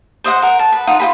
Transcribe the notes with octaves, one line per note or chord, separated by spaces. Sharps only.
C5 D#5 E5 F#5
A#4 F#5
A5
B4
D#4 F4 F#5
F4 G#4 B5